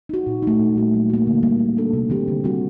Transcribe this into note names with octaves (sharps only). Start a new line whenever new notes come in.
D#4 F#4
A#2
A3 D#4
A#2
G3 A#3 F#4
F#3
A#3 F#4
D3
G3 A#3
G3
A#3 D4 A4
C3
D#3 G3 C4 G4
D3
G3 C4 F#4